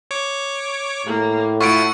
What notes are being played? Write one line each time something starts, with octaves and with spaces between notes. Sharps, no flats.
C#5 D6
A2 A#3
A3 E4 F4 F#5 C#6 D7